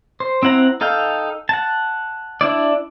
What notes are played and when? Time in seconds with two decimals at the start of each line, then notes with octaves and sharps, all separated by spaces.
0.20 C5
0.43 C4 E4 F#5 A#5
0.81 D#4 A4 F5 G5
1.49 F#5 A5
2.41 D4 E4 D5